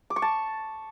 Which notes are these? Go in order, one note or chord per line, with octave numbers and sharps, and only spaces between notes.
D6
C#6
A5